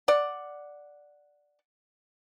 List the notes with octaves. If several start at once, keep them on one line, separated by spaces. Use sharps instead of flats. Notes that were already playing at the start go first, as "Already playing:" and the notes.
D5 F#5